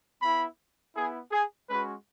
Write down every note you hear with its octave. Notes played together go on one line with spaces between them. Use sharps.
B3 E4 B5
B3 E4 G#4
G#4
G#3 C#4 F#4 B4